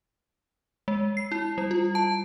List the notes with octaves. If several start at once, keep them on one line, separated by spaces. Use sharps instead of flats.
G#3
C7
E4
G3
F4
A5